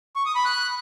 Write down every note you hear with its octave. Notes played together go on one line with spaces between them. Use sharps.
C#6
D#6
B5
F#6